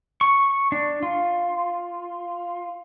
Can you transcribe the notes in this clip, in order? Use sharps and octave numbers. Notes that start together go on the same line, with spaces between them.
C#6
D4
F4